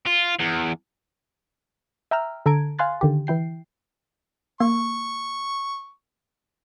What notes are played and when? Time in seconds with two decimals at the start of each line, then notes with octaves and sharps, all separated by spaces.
0.06 F4
0.40 E2
2.11 E5 G5 A#5 E6 F6
2.46 D3 A4 A#5 G#6 D7
2.79 F5 G#5 C6 F#6 A6
3.01 D3 D#3 G4
3.27 E3 E4 G5 C7
4.60 A#3 C#6